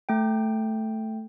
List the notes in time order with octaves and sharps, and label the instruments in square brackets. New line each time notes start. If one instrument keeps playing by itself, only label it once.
[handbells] A3 G5